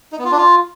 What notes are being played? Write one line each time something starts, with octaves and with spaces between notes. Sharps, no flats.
D#4
B3
F4
D4
F4